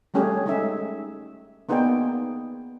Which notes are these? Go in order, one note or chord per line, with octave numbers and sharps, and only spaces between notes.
G3 A3 C#4 G4 G#4
G#3 A3 D#4 G#4 E5
A#3 B3 D#4 G#4 D5 G5